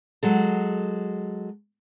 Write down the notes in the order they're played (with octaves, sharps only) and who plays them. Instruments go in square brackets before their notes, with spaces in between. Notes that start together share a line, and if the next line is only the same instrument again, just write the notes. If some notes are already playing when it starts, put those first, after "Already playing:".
[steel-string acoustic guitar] F#3 G#3 A4